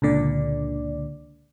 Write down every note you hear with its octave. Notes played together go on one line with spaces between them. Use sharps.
C#2 A#2 D3 D5